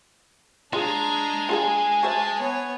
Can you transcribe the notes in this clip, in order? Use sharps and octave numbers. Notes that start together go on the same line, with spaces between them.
G#3 D4 F4 G#4 A#5
F4 G#4 G#5 A5
F#4 C5 E5 A5
B3 C#5